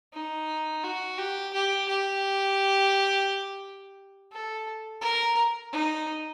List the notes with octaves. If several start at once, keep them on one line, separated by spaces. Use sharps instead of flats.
D#4
F#4
G4
G4
G4
A4
A#4
D#4